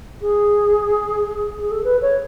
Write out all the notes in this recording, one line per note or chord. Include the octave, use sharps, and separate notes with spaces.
G#4
G#4
A4
B4
C#5